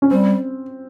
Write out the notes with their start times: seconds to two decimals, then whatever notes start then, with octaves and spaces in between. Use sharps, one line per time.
0.02 C#4
0.11 G3 C4